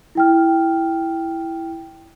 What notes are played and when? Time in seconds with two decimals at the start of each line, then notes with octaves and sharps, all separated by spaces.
0.15 E4 G5 F6